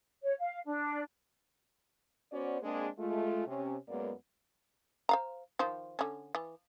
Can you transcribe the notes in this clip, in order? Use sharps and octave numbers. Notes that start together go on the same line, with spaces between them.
C#5
F5
D4
B3 C#4 F#4 C5 D5
G#3 A#3 C4 D4 G#4
G#3 A3 F4
C3 C#4
F#2 G#3 A#3 B3 B4 D5
C5 F5 A#5
D#3 F3 C5
D3 C#4
E3